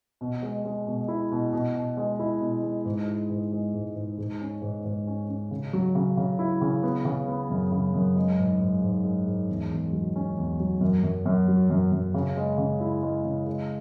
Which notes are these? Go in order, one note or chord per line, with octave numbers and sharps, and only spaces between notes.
B2
G#3
G#3
B2
E4
B2
B2
B2
G#3
E4
B2
G#3
G#2
E4
G#2
G#3
G#2
G#2
G#2
C#4
G#2
G#2
C#4
C#4
C#3
F#3
C#3
C#3
E4
C#3
B3
C#3
B3
F#2
C#3
F#2
G#3
G#2
G#2
G#2
G#3
G#2
E2
E2
F#3
C#4
E2
F#3
F#2
F#2
F#2
F#3
F#2
F#2
C#3
G#3
C#3
E4
G#3
C#3
G#3